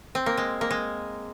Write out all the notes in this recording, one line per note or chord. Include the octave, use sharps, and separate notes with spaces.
C4
A#3
G#3
A#3
G#3